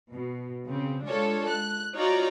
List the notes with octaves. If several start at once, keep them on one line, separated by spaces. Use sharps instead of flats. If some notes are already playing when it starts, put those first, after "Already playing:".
B2
C#3 C4
G#3 D4 F4 A4 C#5
F#6
D#4 F4 F#4 C#5 D5 A#5